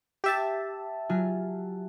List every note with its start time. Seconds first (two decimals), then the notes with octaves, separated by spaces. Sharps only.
0.24 G4 E5 A5
1.09 F#3 F4 G#5